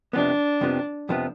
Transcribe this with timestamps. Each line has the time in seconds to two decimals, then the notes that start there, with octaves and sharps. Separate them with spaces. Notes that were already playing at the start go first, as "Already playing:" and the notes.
0.13 F2 C3 F3 B3 D4
0.61 F2 C3 F3 B3
1.09 F2 C3 F3 B3